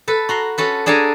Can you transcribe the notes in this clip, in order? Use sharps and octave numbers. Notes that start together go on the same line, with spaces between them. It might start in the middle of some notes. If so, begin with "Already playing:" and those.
A4 B4
F#4 A#5 C6
C#4 F#4 A4 B4
D4 G#4 A4 D5 G#5 A#5